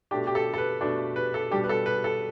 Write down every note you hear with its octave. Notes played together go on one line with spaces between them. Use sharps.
B2 A3 D4 G4
G4
A4
A4
B4
B2 A3 D4
B4
A4
B2 G3 D4 G4
B4
A4
B4
A4